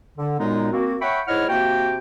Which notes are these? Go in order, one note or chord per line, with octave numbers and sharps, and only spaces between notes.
D3
F#2 A#2 G#3 B3 D#4
A#3 C4 F#4
C#5 E5 F#5 G5 B5 C#6
G#2 E4 C#5 D#5 F#5 F6
C3 A#3 F#4 G5